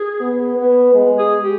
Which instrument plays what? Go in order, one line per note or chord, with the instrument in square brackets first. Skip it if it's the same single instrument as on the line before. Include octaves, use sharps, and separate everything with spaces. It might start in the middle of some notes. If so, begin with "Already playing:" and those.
Already playing: [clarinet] G#4
[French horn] B3
B3
G#3
[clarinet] G#4
G4